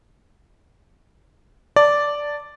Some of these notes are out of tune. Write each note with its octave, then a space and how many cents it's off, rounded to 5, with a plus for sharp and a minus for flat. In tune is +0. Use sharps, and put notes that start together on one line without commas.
D5 -5 A5 +20